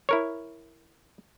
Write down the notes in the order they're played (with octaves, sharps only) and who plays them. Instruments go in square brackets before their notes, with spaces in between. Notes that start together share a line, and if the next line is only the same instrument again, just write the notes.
[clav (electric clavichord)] E4 A#4 C#5